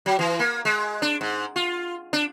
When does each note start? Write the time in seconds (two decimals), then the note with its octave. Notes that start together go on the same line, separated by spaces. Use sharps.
0.06 F#3
0.19 E3
0.39 A#3
0.65 G#3
1.02 D4
1.21 G#2
1.56 F4
2.13 D4